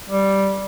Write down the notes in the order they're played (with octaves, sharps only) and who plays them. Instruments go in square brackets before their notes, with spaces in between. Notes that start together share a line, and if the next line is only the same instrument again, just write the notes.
[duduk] G3